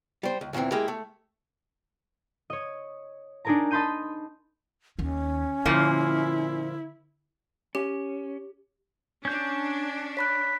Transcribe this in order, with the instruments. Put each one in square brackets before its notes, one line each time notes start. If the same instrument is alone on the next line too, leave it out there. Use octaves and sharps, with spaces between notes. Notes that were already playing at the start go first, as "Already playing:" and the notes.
[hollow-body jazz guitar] G3 C5
C#2
D2 A#2 D3 E3 C4
G#3 A#3 E4 G4 A#4
A3
[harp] C#5 D#5
D4 D#4 G#4 A#4 A5 A#5
D#5 A5 B5 C6 G6 D#7
[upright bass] D#2 D#3 [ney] C#4
[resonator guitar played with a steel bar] A#2 F3 A#3 [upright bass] D3 [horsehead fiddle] E4
[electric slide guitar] C#4 [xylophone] G4
[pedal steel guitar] C#4 G6 [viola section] D4
[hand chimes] C#5 B5 F#6 [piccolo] B6